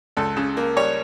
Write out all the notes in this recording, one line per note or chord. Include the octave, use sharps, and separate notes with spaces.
C#2 A4
C#3
A#3
G3 C#5